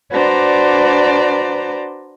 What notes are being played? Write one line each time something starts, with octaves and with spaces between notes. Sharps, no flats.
D4 F#4 B4 C5 D5 A#5